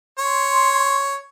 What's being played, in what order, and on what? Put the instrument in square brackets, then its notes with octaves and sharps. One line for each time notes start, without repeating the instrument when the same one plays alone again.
[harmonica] C#5 [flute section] C6